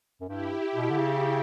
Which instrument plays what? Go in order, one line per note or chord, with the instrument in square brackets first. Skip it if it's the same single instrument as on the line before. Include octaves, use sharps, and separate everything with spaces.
[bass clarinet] F#2
[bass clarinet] G2 [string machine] E4 G4
[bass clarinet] B2
D3
C#3